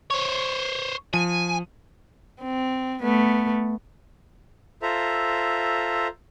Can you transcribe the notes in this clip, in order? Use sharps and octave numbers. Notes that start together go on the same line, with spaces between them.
C5 C#5
F3 G#5 D#7
C4
A3 B3
F4 A4 C5 E5 A#5